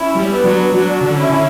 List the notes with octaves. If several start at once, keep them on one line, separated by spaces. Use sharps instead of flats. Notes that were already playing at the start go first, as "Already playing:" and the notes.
Already playing: C#4 E4
G3
B3 D4
F#3
F#3 D4 F#4
D3
C#4 E4
D3